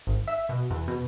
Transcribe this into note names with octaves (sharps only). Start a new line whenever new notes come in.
G#1
E5
B2
E2
B2